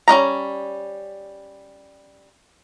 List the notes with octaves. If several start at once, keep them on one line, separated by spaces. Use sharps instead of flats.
G3 C#4 D#4 A#5